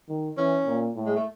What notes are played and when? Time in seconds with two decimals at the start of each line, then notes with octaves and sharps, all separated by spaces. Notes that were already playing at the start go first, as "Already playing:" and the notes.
0.09 D#3
0.37 E3 C#4
0.66 A#2
0.96 A2
1.06 G#3
1.16 A3